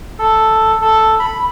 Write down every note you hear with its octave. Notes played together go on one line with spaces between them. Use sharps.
A4
A4
B5